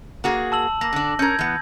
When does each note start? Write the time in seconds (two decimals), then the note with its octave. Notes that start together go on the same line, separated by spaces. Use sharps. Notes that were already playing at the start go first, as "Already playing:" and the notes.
0.24 A#3 F#4 G#4
0.52 A5 E6 F#7
0.81 A#3 A#6
0.93 D3 D4
1.19 C#4 A#4 G6 G#6
1.39 E3 B3